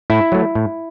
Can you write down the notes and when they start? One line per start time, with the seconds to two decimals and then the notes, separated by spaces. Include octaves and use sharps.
0.10 A2 E4
0.32 F#3 A3
0.55 A2